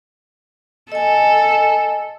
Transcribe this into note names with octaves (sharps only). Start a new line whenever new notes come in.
A4 D#5 G#5